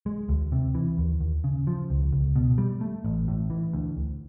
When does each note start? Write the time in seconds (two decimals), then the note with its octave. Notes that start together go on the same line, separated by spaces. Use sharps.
0.06 G#3
0.29 D2
0.52 C3
0.75 E3
0.98 D#2
1.21 D#2
1.44 C#3
1.67 F3
1.90 C#2
2.13 C#2
2.36 B2
2.58 G3
2.81 A3
3.05 A1
3.28 A2
3.50 E3
3.73 D2
3.97 D2